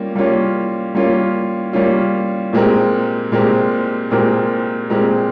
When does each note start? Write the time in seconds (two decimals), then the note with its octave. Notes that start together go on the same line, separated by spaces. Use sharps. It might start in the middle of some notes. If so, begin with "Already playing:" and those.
Already playing: G3 A#3 C#4 F4
0.15 G3 A#3 C#4 F4
0.95 G3 A#3 C#4 F4
1.73 G3 A#3 C#4 F4
2.53 A#2 G#3 C4 G4 A#4
3.32 A#2 G#3 C4 G4 A#4
4.11 A#2 G#3 C4 G4 A#4
4.90 A#2 G#3 C4 G4 A#4